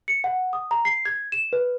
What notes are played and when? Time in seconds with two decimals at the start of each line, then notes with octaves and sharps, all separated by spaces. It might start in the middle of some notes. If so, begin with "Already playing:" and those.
0.08 C#7
0.24 F#5
0.53 D#6
0.71 A#5
0.85 C7
1.06 G#6
1.32 E7
1.53 B4